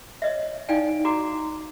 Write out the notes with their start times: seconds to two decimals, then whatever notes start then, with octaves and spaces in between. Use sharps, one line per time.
0.22 C#5 D#5 E5
0.69 D#4 D5 F5 G5 G#5
1.05 F#4 A#5 D6